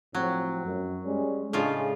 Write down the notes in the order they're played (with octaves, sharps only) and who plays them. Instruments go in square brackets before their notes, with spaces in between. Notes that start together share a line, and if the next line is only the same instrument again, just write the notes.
[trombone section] A2 F3 C4 [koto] F#3
[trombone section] F#2
G3 G#3 C#4
[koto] A2 C#3 F4 [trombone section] G#3 D4 G#4